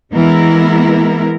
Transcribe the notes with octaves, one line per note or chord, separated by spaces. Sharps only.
E3 G#3 B3 E4 A#4